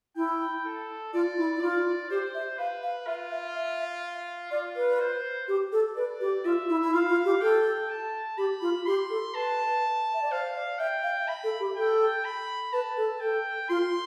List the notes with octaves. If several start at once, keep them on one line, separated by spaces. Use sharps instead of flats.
E4 G5
A4
F4 D5
E4
E4
F4 D5
G4 C5
E5
B4 F5
F5
F4 E5
E5
E5
F4 D5
B4
C5
G4
A4
B4 D5
G4
F4 E5
E4
E4
F4 F5
F4
G4
A4 G5
A5
G4 B5
F4
G4 C6
A4
B4 A5
E5
D5
C5 F5
D5
E5 G5
F5
E5 B5
A4
G4
A4 G5
B5
B4 A5
A4
A4 G5
F4 C6